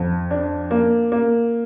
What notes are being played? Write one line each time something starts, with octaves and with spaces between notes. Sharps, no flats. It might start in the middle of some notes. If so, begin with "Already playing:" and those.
Already playing: F2
D4
A#3
A#3